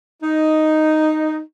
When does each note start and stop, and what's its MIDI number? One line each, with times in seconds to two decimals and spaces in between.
0.23 1.39 63